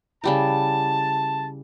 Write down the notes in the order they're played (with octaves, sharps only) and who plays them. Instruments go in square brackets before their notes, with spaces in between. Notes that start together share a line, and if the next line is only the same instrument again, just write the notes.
[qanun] C#3 G3 E4 [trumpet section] A5